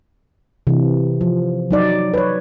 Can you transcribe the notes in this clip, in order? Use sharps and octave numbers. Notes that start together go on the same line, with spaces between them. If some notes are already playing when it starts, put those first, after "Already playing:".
C3 E3
F3
F#3 D#4 D5
B4 C#5